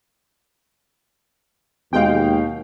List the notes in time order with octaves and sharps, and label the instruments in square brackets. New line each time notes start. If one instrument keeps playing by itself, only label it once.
[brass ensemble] D#2 [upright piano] B2 F5 [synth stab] G#3 G5